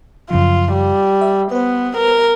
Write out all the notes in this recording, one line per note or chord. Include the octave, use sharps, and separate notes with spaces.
F#2 C#3 F3 F4
G3
E5
B3 B4 C5
A#4